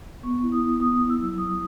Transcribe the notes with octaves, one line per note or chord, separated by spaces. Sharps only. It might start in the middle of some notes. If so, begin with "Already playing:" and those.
B3 C#6
E4
D#6
B3
B3 D#6
E4
E6
F#3
E4 D#6